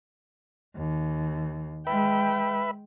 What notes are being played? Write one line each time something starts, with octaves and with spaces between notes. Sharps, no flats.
D#2
G#3 B4 E5 G5 B5